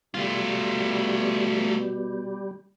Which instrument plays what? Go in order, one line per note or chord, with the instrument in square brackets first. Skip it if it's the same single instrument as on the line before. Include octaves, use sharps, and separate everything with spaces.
[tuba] B2 [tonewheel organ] G3 [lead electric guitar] A3 F4